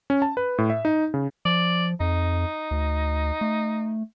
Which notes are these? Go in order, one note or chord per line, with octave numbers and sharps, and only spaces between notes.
C#4
A5
B4
A2
E5
D#4
C#3
F3 D5
F2 D#4
D2
A3